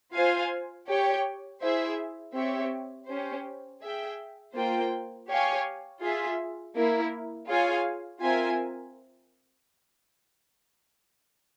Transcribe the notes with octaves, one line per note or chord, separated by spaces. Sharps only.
F4 C5 F5 G#5
G4 C#5 G5
E4 G#4 C5 E5
C4 G4 C#5 E5
C#4 G4 C5
G#4 E5 G5
A#3 F4 C5 G5
G4 C#5 F5 G#5
F4 G#4 E5
A#3 E4 A#4
F4 G#4 C#5 F5 G#5
C4 F4 A#4 E5 G#5